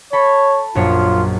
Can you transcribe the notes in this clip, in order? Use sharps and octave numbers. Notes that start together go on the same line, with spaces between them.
A4 C#5 B5
A#1 F#2 F4 C#5